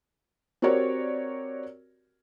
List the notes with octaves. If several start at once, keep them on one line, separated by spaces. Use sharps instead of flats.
C4 F#4 G4 A#4 C#5 D5